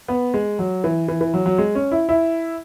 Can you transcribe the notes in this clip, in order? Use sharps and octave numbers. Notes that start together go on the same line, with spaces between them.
B3
G#3
F#3
E3
E3
E3
F#3
F#3
G#3
C#4
E4
E4